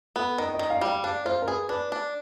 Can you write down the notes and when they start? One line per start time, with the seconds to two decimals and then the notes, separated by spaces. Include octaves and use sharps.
0.16 B3 A4
0.38 D#3 A#4
0.54 D#5
0.59 D#3
0.70 F5
0.81 G3
0.88 F5
1.04 D4 F5
1.25 F4 C5
1.42 A#4
1.48 G#4 B4
1.69 D4 B4
1.92 D4